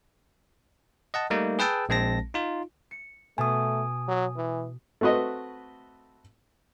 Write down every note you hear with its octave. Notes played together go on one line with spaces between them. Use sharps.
D#5 F#5 A5
G3 A3 A#3 D#4
G#4 B4 G5 A5 E6
A#1 G#3 C4 A5 A#6
D#4 F4
C#7
B2 A3 G#5 D#6
F#3
E3
A3 C4 F#4 B4 D#5